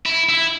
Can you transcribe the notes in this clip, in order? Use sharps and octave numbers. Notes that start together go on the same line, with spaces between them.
E4
E4